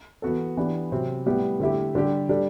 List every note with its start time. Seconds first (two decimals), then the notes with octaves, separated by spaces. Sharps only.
0.22 E3 B3 F#4 A4
0.57 E3 B3 D4 G4
0.92 C3 F#3 C4
1.26 A2 G3 B3 E4 G4
1.60 D3 A3 E4 G4
1.95 D3 G3 D4 G4
2.29 G3 D4 A4